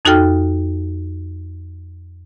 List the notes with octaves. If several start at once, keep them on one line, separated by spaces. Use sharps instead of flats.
F2 D#4 F#4 A4 G5 F6